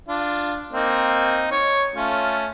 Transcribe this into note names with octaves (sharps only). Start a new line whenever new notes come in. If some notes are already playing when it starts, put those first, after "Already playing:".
D4 F4
A#3 C4 D#4
C#5
A3 C#4 F4